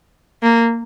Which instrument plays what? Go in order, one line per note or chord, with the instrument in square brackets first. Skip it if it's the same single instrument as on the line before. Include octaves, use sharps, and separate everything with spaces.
[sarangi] A#3